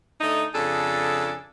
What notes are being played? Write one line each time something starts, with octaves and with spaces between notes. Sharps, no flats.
D3 A3 D#4
F2 C#3 D4 G#4 A4